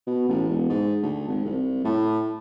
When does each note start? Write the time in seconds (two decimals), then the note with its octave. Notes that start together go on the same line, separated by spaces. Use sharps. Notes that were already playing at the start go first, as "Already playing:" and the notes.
0.07 B2
0.28 A1
0.49 E1
0.70 G#2
1.03 D2
1.28 G#1
1.45 C2
1.85 A2